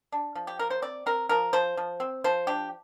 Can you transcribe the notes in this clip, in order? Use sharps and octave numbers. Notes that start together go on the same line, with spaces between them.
D4
F3
G4
A#3 A#4
C5
C4 D5
C4 A#4
F3 A#4
F3 C5
F3
C4
F3 C5
D4 G4